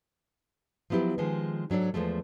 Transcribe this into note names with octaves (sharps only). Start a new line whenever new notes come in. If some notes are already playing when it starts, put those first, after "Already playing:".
F3 F#3 B3 E4 G4
D#3 F3 G#3
G#2 F#3 D4 A4 C#5
E2 F3 G#3 A3